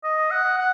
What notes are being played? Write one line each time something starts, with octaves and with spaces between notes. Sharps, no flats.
D#5
F#5
F#5